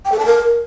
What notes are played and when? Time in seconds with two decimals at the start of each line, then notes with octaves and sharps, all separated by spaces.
0.05 G5
0.12 A4
0.19 A5
0.26 A#4